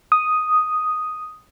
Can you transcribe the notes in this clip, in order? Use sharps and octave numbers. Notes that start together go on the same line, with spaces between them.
D#6